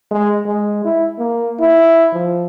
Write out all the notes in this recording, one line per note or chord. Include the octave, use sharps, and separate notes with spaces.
G#3
G#3
E4
A#3
E4
F3